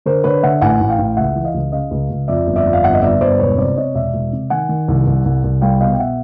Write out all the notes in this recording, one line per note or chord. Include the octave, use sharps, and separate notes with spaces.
D3 A#4 C5
D3 B4 C#5
D3 E5 F#5
A1 F#5 G#5
A1
F5 G5
A1
C#2 E5 F#5
E3
D#5 F5
C#2
C#3 D#5 F5
C#2
C#2
F2 D5 E5
G1
D5 E5
F2
F5
G1 E5 F#5
D#5
G1 D5 E5
G1 C5 D5
E1 B4 C#5
C3 C5 D5
C3 C#5 D#5
E1 D5 E5
E1
C3
D#3 F#5 G#5
D#3
C2
C2
C2
C2
G3 F5 G5
B2 D#5 F5
G5
B2 E5 F#5